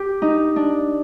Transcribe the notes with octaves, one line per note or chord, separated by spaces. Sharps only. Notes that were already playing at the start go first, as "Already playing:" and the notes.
Already playing: G4
D#4
D4